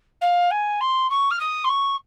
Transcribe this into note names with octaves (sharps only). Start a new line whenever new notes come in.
F5
G#5
C6
C#6
F6
D#6
C6
C#6